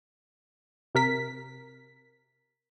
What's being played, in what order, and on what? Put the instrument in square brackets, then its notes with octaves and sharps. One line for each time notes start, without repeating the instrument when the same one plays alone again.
[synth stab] C3 A#4 B6